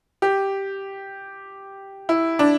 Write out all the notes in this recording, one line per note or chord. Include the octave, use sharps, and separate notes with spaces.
G4
E4
D4